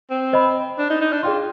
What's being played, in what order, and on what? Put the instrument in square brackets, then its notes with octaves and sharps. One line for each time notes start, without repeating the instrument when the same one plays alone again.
[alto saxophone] C4
[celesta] C5 D#5 B5
[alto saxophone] D4
D#4
D#4
D4
[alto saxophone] F4 [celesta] G#4 D5 G5 C6